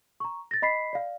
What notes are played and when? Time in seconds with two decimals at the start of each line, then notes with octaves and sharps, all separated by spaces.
0.20 A#5 C#6
0.51 A6 A#6
0.62 D#5 B5 B6 C7
0.93 D5 F5